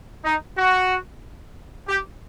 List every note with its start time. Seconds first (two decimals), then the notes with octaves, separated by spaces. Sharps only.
0.25 D#4
0.57 F#4
1.87 G4